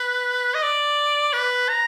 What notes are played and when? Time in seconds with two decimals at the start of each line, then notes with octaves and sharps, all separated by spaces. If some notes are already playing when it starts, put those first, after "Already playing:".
Already playing: B4
0.54 D#5
0.62 D5
1.33 B4
1.69 A#5